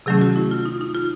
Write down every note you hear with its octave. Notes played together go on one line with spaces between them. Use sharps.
C3 D#3 F#3 A3 C#4 G#4
F#4
E4
F4
D#4
D#4
F4